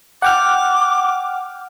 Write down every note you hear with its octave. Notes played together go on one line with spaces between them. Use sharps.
F#5 G5 D6 F6